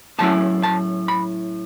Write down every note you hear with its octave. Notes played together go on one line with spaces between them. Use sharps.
A2 F#3 C#4 E4 A5
A5
B5